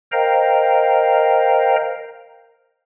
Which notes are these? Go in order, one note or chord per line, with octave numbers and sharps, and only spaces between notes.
A#4 C5 D#5 F5 G5 A#5